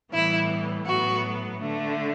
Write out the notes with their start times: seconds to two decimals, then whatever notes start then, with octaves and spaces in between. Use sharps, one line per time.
0.12 A2 E3 G3 B3 E4
0.85 A2 F#3 B3 F#4
1.59 D3 A3